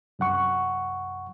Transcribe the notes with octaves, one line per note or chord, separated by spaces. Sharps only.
C2 F#2 F#5 C#6